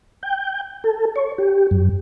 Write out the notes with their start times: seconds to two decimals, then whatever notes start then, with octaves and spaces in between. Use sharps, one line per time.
0.23 G5
0.84 A4
1.16 C#5
1.38 G4
1.71 F#2